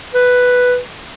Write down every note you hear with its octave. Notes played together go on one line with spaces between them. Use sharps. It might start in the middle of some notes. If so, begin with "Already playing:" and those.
B4